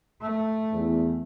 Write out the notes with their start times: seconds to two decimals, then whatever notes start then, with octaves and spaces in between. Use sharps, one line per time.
0.21 A3
0.73 E2